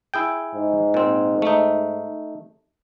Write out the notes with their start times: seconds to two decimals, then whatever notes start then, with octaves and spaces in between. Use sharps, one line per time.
0.14 E4 G#4 G5
0.55 G#2
0.94 A#2 C4
1.42 A3 D#4